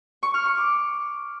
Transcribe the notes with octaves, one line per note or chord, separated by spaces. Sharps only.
C#6
F6
C#6
D6